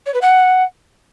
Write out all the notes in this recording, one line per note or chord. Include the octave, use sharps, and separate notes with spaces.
C#5
B4
F#5